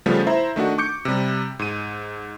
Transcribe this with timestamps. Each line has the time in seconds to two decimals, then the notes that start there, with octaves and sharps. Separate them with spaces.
0.06 C#3 F3 G3 A3 B3
0.27 E4 C5 E5 A#5
0.56 D#3 A3 D4 F#4
0.78 C#6 D6 G6 C#7
1.05 C3 G3
1.59 G#2 D#7